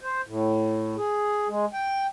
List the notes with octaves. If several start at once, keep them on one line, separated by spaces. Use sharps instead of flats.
C5
A2
G#4
G#3
G5